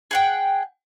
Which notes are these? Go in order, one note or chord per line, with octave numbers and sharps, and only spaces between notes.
G#4 F#5 G5